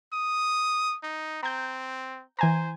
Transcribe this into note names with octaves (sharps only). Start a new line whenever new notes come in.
D#6
D#4
C4 A#5 G6
E3 C5 G#5 A#5